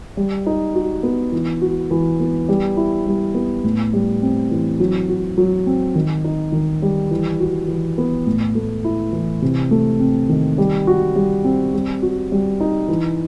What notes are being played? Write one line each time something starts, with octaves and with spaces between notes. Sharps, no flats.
G3
D#4
F#4
B3
E3
F#4
E3
B3
G3
E4
G3
B3
A2
G3
C4
E3
F#3
F#4
F#3
C4
D#3
D#4
D#3
G3
E3
F#4
E3
B3
A2
A3
E4
E3
C3
A3
C4
D#3
G3
F#4
G3
C4
G3
F#4
G3
D#4
E3